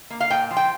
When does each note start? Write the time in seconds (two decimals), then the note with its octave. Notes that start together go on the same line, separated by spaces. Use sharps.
0.10 A#3
0.20 F5
0.30 A#2 G5
0.51 F3
0.57 G5